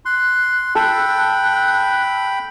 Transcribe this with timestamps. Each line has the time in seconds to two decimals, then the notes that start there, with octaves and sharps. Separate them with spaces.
0.05 C6 F#6
0.75 A4 G5 B5